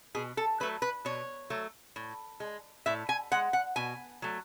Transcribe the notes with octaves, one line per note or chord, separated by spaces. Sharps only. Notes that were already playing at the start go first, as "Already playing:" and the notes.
B2 G#4
A4
F#3 A3 B4
B4
B2 C#5
F#3 A3
A2
G#3
A2 E5
G#5
G#3 F#5
F#5
B2 G#5
F#3 A3